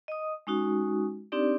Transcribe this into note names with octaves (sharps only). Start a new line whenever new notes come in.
D#5 D#6
G#3 C#4 D#4 F#4
C4 D4 D#4 G4 D5